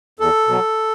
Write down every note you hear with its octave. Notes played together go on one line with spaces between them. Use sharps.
E2 A4
B2 F#3